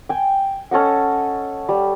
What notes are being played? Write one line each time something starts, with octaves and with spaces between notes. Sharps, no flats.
G5 G#5
C#4 A4 D#5 F#5
G3